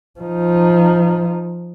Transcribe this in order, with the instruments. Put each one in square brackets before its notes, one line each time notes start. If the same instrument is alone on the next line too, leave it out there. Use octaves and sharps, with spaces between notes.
[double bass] F3 D#4